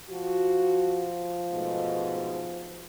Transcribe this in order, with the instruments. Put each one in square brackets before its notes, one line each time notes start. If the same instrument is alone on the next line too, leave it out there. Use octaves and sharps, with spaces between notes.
[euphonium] F3 [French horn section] F#4
[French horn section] G#2 B2 A3